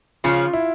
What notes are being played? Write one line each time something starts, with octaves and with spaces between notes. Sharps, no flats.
C#3 F3 C#4 F4
E4